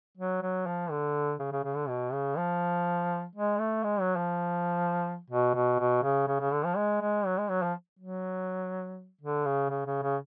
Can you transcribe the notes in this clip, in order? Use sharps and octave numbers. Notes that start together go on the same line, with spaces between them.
F#3
F#3
F3
D3
C#3
C#3
C#3
D3
B2
C#3
F3
G#3
A3
G#3
F#3
F3
B2
B2
B2
C#3
C#3
C#3
D3
F3
G#3
G#3
F#3
G#3
F#3
F3
F#3
D3
C#3
C#3
C#3
C#3